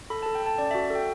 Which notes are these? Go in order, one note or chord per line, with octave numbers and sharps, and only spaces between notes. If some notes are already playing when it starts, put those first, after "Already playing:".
A4 B5
A5
A4
G5
A4 A5
C#4 D5
E5
F#4
A4 G5